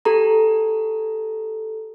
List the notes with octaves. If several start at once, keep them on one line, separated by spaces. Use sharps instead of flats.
G4 A4 A#5